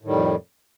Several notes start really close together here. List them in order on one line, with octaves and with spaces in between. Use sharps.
A2 D#3 G3 F2